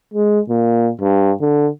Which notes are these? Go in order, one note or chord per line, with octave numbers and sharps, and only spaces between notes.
G#3
A#2
G2
D3